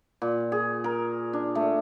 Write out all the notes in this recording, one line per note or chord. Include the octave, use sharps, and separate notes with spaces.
A#2
G#4
A#4
D4
A3